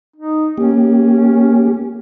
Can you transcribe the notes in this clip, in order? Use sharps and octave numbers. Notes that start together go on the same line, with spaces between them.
D#4
A#3 C#4 G4